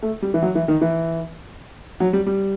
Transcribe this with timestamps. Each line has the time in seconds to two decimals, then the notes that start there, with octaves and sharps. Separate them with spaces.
0.02 A3
0.22 G3
0.34 E3
0.42 F#3
0.55 E3
0.68 D#3
0.81 E3
2.00 F#3
2.13 G3
2.26 G3